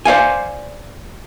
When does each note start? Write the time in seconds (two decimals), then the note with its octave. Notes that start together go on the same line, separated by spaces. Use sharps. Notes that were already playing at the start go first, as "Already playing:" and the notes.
0.05 C5 D5 F5 G#5